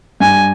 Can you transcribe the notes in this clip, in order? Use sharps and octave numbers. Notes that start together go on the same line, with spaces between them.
G2 G#5